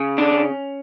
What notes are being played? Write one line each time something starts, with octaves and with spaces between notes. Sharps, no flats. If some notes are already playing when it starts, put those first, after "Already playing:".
Already playing: C#3
D4
C#4